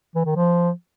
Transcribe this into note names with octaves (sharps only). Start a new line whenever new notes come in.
E3
D#3
F3